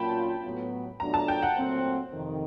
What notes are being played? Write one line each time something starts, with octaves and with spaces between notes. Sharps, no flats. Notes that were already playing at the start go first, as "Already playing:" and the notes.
Already playing: A#2 F#3 A#3 C#4 F4 G5 A5 B5
A2 F#3 B3
B2 F#3 A3 D4 F4 A#5
A5
G5
F#5
A#2 F#3 A3 C4
F2 C3 D#3